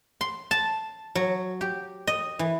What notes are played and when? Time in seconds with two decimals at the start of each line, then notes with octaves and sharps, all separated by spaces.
0.21 C6
0.51 A5
1.15 F#3
1.61 G4
2.07 D#5
2.39 E3